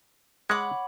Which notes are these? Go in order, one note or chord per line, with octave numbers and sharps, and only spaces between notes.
G#3 C#5 F#5 B5 D6